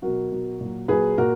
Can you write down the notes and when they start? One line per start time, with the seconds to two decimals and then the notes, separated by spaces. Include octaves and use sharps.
0.02 B2 F#3 F#4 A#4
0.32 B2 F#3
0.61 A#2 F#3
0.88 A#2 F#3 G#4 B4
1.18 A#2 F#4 A#4